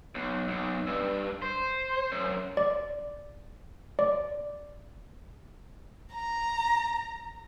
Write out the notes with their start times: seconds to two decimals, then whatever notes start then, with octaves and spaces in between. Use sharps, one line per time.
0.15 B1
0.48 B1
0.87 G2
1.42 C5
2.12 F#2
2.57 D5
3.99 D5
6.13 A#5